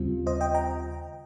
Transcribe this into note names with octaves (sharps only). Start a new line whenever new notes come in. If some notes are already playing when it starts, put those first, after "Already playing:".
Already playing: D#2 C#3 G3 C4 F4
C5 D#5
D#5 G5
G5 A#5